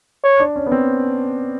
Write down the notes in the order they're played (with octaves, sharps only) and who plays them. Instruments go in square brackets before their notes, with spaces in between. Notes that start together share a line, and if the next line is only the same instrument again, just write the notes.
[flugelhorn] C#5
[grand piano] D4
C#4
B3
C4